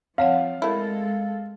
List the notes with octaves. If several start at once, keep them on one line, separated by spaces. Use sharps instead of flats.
F3 C4 C#5 F5 F#5
G#3 A3 E4 A4 A#4